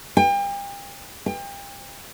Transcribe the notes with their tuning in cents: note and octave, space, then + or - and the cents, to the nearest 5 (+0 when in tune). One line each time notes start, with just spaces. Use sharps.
G5 +35
G5 +35